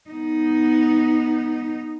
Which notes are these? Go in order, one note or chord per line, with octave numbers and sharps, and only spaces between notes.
B3 D#4